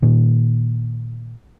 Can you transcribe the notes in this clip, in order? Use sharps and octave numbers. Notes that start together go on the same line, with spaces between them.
A#2 D#3